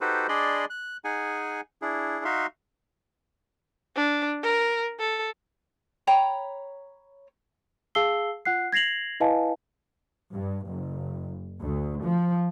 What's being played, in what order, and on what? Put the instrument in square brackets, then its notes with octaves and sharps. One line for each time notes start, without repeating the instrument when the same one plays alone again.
[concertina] D#4 F#4 G4 A4 B4 C5
D4 G#4 D5 D#5 B5 C6
F#6
D#4 G#4 F#5 G#5
D4 E4 G#4
D#4 F#4 E5 F5 C6
[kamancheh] D4
A#4
A4
[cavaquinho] C#5 G5 A#5 B5
[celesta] G#4 F5 A5 E6 C7 G7
F4 F#5 F#6 C7
G#6 A#6 C7 F7 F#7
E4 B4 D#5 F5 G#5 A5
[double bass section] G2
F#1
D2
F3